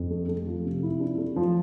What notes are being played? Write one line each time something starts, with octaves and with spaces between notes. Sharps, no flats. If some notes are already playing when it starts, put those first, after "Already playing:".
Already playing: F2
A3
A3
F3
C3
E4
D4
A3
F3